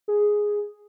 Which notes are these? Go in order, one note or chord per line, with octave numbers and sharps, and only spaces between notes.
G#4